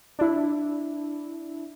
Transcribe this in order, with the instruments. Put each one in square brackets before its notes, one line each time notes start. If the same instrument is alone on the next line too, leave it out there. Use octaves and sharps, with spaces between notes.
[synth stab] D4 E4